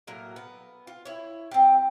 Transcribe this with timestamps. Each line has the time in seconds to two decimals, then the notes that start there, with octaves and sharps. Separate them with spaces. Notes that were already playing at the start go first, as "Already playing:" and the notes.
0.07 A2 F#3 A#3 A#4
0.36 B3
0.87 F4
1.06 E4 C#5
1.51 C4 G4